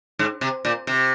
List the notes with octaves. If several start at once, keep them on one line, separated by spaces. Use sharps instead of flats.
G#2
C3
A#2
C3